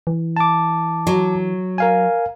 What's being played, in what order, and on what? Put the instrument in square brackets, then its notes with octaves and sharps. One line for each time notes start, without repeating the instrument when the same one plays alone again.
[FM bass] E3
[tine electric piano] A5 D6
[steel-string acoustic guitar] F#3
[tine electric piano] A#4 F5 G#5